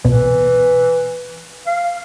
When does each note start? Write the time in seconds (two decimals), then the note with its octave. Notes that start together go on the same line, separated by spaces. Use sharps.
0.05 C2 B2 E3
1.67 F5